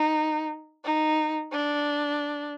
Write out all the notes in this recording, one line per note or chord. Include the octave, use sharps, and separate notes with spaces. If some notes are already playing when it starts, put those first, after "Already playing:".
Already playing: D#4
D#4
D4